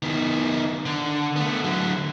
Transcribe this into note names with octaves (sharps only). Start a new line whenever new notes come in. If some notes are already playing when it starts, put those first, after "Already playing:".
D#3 B3
D3
A3 B3
D3 F#3